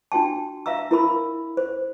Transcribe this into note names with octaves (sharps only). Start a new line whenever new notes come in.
D4 F#4 G5 A5
E5 F5 A#5 E6
E4 A#4 B5 E6
C5